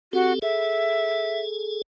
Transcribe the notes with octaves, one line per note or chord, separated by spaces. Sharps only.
C4 F#4 G4 A4
G#4 A4 E5